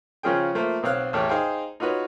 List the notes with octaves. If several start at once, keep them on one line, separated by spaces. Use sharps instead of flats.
C#3 F3 C#4 F4 G#4 G5
F3 A3 A#3 A#4 C5
B1 C4 C#5 F5 F#6
A1 E2 A3 C#5 G5
D#4 G#4 C5 F5 G5
D#4 F4 F#4 B4 C#5